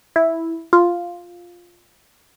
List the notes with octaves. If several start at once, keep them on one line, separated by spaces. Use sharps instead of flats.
E4
F4